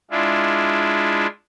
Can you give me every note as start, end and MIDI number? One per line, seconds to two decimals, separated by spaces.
0.11 1.27 56
0.11 1.27 62
0.11 1.27 64
0.11 1.27 65